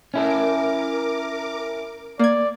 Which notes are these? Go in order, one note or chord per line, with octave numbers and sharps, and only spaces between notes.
C#4 E4 A4 A#4 D6
A#3 D5 G#6